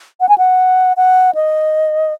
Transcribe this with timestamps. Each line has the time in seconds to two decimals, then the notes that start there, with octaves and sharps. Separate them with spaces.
0.20 F#5
0.29 G#5
0.38 F#5
0.97 F#5
1.34 D#5